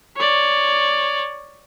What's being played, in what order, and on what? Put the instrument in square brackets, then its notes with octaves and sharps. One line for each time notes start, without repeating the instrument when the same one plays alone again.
[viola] C#5 D5